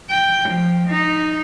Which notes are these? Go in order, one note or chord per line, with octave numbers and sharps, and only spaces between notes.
G5
F3
D#4